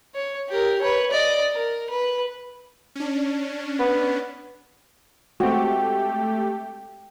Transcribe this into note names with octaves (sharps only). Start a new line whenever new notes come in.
C#5
G4 A#4
B4 C#5
D5 D#5
A#4
B4
C#4 D4
B3
G#3 A3 C4 F#4 G4 G5